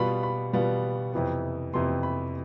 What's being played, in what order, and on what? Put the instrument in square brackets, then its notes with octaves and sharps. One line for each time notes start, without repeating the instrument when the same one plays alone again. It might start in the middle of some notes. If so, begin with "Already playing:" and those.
Already playing: [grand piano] B2 G3 B3 F4 B5
B5
B2 G3 B3 F4
F2 C3 E3 B3
F2 C3 E3 B3 C6
B5